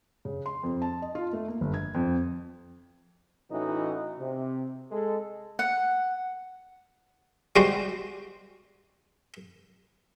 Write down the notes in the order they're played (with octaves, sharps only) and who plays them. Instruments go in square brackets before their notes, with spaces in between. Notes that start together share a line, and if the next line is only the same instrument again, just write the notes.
[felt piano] C#3
C6
F2
A5
D#5
F4
A3
A#3
G1
G#6
F2
[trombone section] A2 E3 C#4 D#4 E4 F#4
C3
G#3 A4
[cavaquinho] F#5
[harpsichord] G3 G#3 F#4 C5